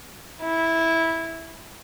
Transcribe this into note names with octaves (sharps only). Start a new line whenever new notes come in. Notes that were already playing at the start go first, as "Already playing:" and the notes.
E4